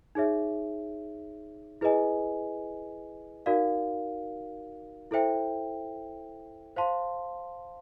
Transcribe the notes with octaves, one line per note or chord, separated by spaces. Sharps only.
D#4 G#4 C#5 E5
E4 G#4 B4 D#5 G#5
D#4 F#4 A#4 D5 F5
E4 A4 C5 E5 G5
C5 F5 A5 C6